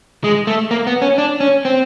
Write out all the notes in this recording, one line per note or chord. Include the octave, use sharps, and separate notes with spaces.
G#3
A3
A#3
B3
C#4
D4
C#4
C4